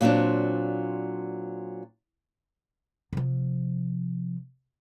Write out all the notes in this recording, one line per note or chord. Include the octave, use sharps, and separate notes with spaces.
A#2 F#3 C4 D4
C3 F3